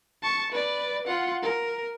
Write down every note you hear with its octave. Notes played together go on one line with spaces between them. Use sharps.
A5 C#6
B4 D5
F4 F#5
A#4